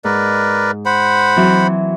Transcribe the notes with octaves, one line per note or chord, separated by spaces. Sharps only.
G#2 A#4 B4 D5
C5 F#5 B5
E3 F#3 C4